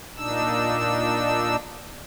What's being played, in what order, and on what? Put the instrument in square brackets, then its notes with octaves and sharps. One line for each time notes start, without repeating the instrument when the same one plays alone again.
[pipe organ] A#2 D4 D#4 E6